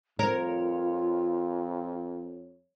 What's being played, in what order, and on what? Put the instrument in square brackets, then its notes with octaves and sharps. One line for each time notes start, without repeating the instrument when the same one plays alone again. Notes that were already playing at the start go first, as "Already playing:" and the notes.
[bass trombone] F2 [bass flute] F4 [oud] A#4 [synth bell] C#5